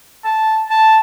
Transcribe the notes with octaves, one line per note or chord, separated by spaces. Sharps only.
A5
A5